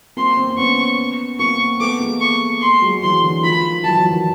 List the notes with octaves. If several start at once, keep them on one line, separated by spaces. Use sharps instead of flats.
A#3 C4 C6
A#3 C4
C4
B3 C#4 C#6
A#3 C4 C#6
A3 B3 D6
G#3 A#3
C#6
C6
F#3 G#3
E3 F#3 C6
D3 E3
D#3 F3 B5
E3 F#3 A5
E3 F#3
D#3 F3